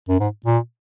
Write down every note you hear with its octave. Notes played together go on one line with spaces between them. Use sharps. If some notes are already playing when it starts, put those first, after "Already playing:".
F#2
G#2
A#2